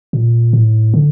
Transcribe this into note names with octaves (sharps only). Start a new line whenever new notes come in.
A#2
A2
D3